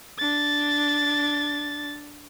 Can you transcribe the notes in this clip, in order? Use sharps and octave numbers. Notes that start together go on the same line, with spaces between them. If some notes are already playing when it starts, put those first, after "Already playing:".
D4 A6